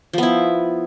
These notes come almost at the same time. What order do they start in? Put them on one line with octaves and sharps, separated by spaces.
F3 B3 E4